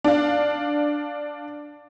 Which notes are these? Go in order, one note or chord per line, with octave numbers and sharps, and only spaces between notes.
D4 F5